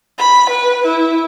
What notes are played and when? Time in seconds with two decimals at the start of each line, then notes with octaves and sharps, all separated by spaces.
0.18 B5
0.49 B4
0.85 E4